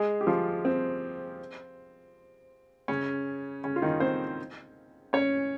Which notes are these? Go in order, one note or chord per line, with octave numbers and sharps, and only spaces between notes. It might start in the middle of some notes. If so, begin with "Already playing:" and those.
Already playing: G#3 G#4
G4
F3 F4
C4
C#3 C#4
C#3 C#4
F4
D#3 D#4
C4 C5
C#4 C#5